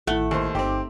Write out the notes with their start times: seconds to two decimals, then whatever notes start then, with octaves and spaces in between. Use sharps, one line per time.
0.07 A1 D#3 A3 E4 F#5
0.31 D#2 C5
0.55 G1 C4 D#4 G4 D6